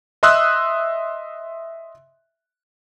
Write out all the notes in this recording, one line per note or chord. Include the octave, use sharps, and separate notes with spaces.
D#5 E5 C6 D#6 E6 F#6